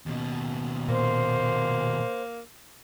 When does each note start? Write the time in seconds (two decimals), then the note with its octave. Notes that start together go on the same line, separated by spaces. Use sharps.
0.06 D#2 B2
0.89 A#2 A#3 C5